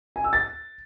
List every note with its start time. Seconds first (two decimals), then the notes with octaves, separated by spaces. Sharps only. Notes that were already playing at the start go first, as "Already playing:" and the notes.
0.16 G#5
0.24 E6
0.33 A6